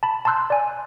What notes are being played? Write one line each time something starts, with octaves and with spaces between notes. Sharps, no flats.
A5 B5
A5 A#5 C6 E6 F#6 G6
D5 G#5